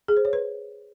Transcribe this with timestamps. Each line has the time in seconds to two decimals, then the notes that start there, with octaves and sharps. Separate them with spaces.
0.08 G#4
0.17 C5
0.25 C#5
0.33 B4